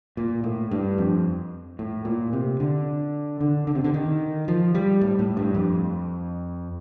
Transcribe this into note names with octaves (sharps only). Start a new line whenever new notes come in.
A#2
A2
G2
F2
A2
A#2
C3
D3
D3
D3
C3
D3
D#3
F3
G3
A2
A2
G2
F2